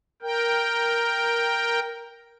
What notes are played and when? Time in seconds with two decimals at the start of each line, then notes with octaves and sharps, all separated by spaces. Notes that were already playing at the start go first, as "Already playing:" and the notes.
0.22 A#4 G5